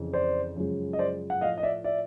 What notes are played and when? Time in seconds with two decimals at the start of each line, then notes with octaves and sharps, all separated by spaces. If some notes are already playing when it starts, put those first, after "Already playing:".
Already playing: F2 C#3 E3
0.13 C5 D5
0.56 F#2 C#3 F3 G#3
0.93 D#5
0.99 C5 D5
1.30 F#5
1.41 A2 F3 A3 D#5 F5
1.58 D#5
1.63 D5 E5
1.84 D5 E5